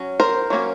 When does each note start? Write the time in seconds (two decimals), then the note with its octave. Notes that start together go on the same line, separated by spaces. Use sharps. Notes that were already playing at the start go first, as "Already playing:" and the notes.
Already playing: F#3 C#4
0.20 A#4 C5
0.50 F#3 A#3 C#4